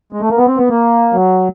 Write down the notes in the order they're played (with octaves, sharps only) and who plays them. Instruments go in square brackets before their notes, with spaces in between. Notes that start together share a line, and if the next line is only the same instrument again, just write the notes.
[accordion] G#3
A3
A#3
B3
C4
B3
A#3
F#3